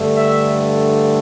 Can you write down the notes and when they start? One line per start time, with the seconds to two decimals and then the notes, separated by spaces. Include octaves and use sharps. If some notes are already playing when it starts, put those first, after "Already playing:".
Already playing: G2 D3 A3
0.16 E5